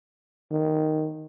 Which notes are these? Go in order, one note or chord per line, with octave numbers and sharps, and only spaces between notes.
D#3